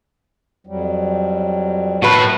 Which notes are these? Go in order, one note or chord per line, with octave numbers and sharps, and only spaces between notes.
F2 F#3 G3
A2 D#3 F#3 F#4 B4